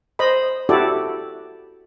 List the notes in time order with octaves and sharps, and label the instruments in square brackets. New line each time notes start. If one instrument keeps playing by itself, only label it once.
[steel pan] C5 D#5 B5
E4 F#4 G4 A4 D5